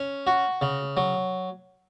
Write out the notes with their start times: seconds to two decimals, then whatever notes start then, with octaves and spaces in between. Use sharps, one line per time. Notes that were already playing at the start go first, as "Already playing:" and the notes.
Already playing: C#4
0.27 F#4
0.62 C#3
0.97 F#3